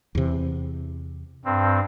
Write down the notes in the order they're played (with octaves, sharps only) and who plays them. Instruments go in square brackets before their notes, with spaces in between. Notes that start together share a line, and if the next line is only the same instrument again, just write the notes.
[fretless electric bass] E2 C3
[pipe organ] G2 C4